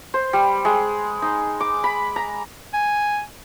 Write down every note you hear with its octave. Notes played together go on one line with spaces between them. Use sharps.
C5
G3
G#3
D#4
D6
B5
A#5
G#5